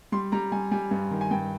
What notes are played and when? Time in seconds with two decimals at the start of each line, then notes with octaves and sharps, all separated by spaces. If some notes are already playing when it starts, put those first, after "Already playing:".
0.12 G3 C6
0.32 G3 A#5
0.52 G3 G#5
0.72 G3 G#5
0.91 G2
1.11 D#3
1.21 G#5
1.31 G2 G5